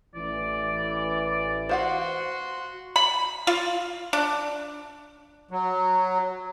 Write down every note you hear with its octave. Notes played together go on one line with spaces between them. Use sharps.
A1 E3 D5
F#4 C5 F5 F#5 C6
B5
F4
D4
F#3